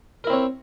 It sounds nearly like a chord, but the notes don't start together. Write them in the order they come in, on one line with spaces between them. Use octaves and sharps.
A#4 E4 C4 C#5